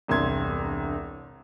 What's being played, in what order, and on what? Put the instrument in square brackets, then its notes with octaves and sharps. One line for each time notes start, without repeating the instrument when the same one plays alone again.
[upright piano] E1 C2 G2 C6 G#6